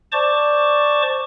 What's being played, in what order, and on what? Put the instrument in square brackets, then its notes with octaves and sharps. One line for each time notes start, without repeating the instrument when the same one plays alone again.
[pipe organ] C5 D5 A5 C#6 D6